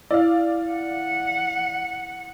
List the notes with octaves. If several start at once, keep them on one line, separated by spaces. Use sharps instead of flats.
E4 D5 F5
F#5